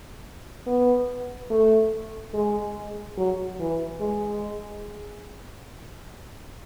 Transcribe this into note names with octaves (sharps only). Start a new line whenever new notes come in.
B3
A3
G#3
F#3
E3
G#3